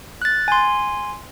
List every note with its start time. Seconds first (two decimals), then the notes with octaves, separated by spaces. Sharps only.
0.22 F#6 A6
0.48 G#5 C6